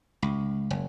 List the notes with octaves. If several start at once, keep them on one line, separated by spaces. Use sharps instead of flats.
C#2
F#1